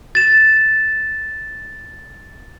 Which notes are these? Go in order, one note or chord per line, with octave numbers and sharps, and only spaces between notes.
A6 E7